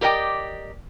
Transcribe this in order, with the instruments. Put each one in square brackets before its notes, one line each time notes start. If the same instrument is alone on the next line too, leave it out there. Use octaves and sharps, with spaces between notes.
[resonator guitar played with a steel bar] G4 A#4 D5 D#5 G5